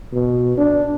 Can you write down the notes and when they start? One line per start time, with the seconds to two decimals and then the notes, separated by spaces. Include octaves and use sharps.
0.13 B2
0.58 D4